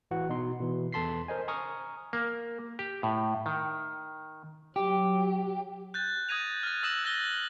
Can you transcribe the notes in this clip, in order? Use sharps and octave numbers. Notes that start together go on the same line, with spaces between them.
A1 E3 F#4 F#5
B2 D#4 C6
B2 E3
E2 A4 A5 C6 B6 C7
A#4 C5 D#5 G#5
G#5 A#5 C#6 D#6 F6
A#3
G4
A2
D#3
F#3 G4
F#6 G6 A6
D#6 G6 G#6 A#6 D#7 F7
F6 A6
D#6 E6 A#6 E7 F#7
F#6 A6 A#6 G7